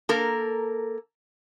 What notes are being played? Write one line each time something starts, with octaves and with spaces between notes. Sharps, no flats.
A#3 A4 A#4